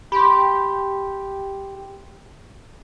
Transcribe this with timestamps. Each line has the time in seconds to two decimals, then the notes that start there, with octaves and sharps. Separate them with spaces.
0.12 G4 B5 C6